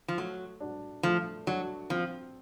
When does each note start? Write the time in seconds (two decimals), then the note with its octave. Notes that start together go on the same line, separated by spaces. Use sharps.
0.08 F3
0.17 F#3 A3
0.60 D4 F#4
1.03 F3 A3
1.47 F#3 D4 F#4
1.90 F3 C4